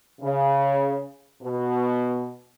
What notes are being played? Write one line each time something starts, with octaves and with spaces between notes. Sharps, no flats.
C#3
B2